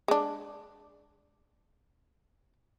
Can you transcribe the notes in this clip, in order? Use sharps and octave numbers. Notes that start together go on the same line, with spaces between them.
G#3 D4